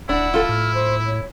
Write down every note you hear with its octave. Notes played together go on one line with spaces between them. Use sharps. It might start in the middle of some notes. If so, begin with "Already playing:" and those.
D1 D4 E4 F#5
F4 A4
A2 F6
C5
C#5